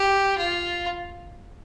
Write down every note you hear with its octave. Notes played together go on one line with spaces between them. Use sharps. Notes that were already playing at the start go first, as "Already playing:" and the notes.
Already playing: G4
F4